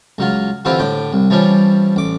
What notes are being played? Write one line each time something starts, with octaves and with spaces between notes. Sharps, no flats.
C#2 F#3 F4
D3 E3 C4 E4 F4 G4
A2 D3 G5
C2
E3 F3 G3 C#4 D4
A1 D6